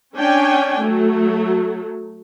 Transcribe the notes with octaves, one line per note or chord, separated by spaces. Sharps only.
C#4 D4 G5 G#5
F#3 A3